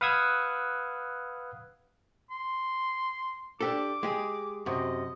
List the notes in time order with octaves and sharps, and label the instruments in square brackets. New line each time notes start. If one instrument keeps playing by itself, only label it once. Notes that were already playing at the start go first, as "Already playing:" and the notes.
[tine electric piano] B4 F5 F#5 D#6 E6 G#6
[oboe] C6
[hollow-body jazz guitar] D4 G4 A4 [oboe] D6
[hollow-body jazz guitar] G#3 G4 G#4
[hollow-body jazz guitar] F#2 C3 [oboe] D#5